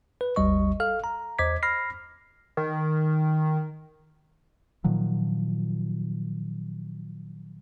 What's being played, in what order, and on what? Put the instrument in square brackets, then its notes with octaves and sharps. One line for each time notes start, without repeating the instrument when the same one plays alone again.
[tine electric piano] B4
G#1 D#2 G3 D#5 C#6
A4 F5 F6
A#5
E2 C5 D#5 D6 G#6 B6
B5 F6 A#6 C7
[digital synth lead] D#3
[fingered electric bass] A#2 D#3 F3 F#3